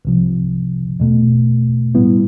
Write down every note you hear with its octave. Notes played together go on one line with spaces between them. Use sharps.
C2 C3 F3
E2 B2 A3
A2 G3 B3 E4